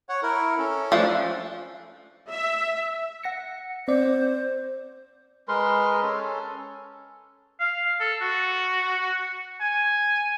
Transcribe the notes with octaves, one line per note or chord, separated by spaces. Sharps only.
C#5 F#5
E4 A#4
C#4 A4
F3 A3 D4
E5
F#5 A#6 C#7
C4 C5 D5
G#3 A#4 B4 C6
C#4 A4
F5
A4
F#4
G#5